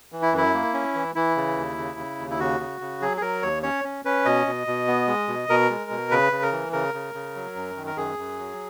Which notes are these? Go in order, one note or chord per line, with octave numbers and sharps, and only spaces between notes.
E3
E4
F#2 E4
A#3
C#4
E3
E3 E4
C#3
D#2
C#3
C#3
D#2
E4
C#3 F#4
C#3
C#3
F#3 G#4
G#4
F#3 A#4
D#2 C#5
C#4 C#5
C#4
C#4 B4
B2 D#5
B2
B2
B3
G#3
B2
B2 A#4
G#3
B2
C#3 B4
C#3
A#4
E3
C#3 A#4
C#3
C#3
F#3
F#2
D#3
A#4
F#2 G#4
F#2
F#3